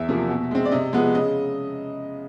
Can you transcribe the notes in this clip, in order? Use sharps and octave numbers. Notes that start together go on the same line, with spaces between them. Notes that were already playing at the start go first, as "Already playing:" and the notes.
Already playing: E2 E5
C3 F3 A#3
B2
G#3 C4
D5
C3 D#5
F3 G#3 B3
C#3 D#5